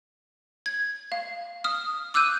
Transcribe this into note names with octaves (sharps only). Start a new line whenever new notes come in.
G#6
F5
D#6 F6
D6 E6 F#6 G6 D#7